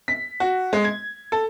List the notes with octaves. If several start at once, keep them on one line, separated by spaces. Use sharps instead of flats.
B6
F#4
G#3
G#6
A4